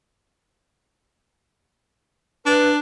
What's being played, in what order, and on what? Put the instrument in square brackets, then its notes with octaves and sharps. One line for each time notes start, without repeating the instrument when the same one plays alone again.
[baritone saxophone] D4 [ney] B4